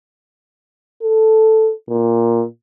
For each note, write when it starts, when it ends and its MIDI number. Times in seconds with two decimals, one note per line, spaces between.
1.03 1.71 69
1.89 2.44 46